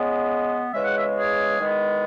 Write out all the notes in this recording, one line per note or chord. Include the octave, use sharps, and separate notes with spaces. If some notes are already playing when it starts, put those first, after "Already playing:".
Already playing: C#3 G#3 B3
E2 C#3 G#3 E5
F#5
E5
G#4
E2 D#3 G#3 B3